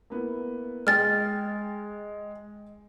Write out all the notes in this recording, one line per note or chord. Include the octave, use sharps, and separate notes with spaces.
A#3 B3 E4
G#3 D#5 G5 G#5 F6 A6